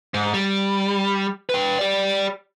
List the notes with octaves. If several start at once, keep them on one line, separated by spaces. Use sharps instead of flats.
G#2
G3
B4 G5
G4 D5